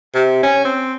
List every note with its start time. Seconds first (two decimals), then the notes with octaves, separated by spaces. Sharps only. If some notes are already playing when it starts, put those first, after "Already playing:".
0.15 C3
0.43 C#4
0.65 C4